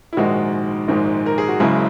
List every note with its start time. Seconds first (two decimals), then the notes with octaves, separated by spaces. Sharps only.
0.13 E4
0.17 A#1 G#2 D#3 G#3 F#4
0.88 A#1 G#2 D#3 G#3
1.26 A#4
1.38 G#4
1.48 F#4
1.60 F#1 F#2 C#3 G#3 E4